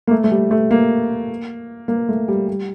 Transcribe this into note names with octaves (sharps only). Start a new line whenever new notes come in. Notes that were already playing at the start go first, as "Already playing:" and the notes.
A#3
A3
A3
G3
A3
A#3
A#3
A3
G3
G3